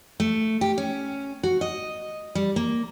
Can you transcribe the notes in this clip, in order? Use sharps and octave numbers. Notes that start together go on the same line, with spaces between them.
A3
G4
C#4
F#4
D#5
G3
A#3